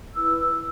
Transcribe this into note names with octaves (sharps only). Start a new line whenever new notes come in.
E4 B4 E6